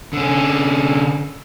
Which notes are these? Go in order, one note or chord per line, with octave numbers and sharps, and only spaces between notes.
D3 C#4